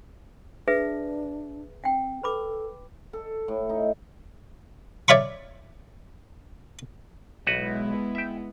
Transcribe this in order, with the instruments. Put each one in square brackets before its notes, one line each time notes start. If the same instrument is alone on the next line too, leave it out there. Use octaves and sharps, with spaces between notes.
[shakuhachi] D4 [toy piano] G#4 B4 E5
[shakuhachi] C4 [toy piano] F#5 G5
[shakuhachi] A4 [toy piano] B4 B5 D6
[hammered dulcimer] A4
A2
D#4
[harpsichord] C#5 D5 E5 F5 B5 C#6
[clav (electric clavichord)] B1 F#4 B4 [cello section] G#3 B3 E4
[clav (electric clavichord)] E5 G5